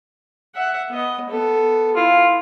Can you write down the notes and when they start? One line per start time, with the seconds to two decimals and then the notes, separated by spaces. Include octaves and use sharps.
0.55 E5 F#5
0.90 B3 D#5
1.30 B3 A4
1.96 E4 F4